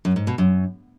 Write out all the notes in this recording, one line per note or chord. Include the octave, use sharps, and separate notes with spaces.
F#2
G#2
B2
F#2